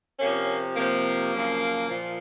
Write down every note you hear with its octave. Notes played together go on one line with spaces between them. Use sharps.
C3 F3 A#3 C#4
C3 F3 A#3
F#2 C#3 F3
A#2 F3